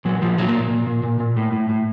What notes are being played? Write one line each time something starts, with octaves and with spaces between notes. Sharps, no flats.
A#2 F#3
A#2 F3
A#2 F#3
A#3
A#2
A#2
A#2
A#2
A#2
A2
A2
A2